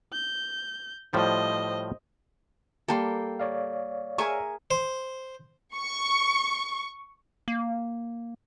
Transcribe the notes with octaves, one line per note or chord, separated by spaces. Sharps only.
G6
A2 F3 G3 C5 D#5
G3 A#3 A4 G5 C6
C#5 D5 F5
G#4 A#4 E5 G#5 C#6
C5
C#6
A#3